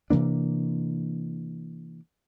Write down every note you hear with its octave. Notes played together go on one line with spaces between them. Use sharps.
C3 E3 A#3 D4